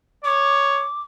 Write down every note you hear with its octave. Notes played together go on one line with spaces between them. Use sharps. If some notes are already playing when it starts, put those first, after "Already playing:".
C#5 D6